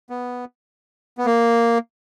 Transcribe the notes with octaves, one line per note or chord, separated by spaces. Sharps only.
B3
B3
A#3